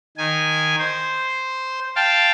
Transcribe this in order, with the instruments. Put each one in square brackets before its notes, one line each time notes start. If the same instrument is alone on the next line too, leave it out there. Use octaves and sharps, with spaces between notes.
[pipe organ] D#3 G#5
C5
F5 G5 A5